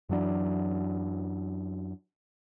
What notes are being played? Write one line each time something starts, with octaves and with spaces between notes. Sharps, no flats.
F#2 E3 F#3 D4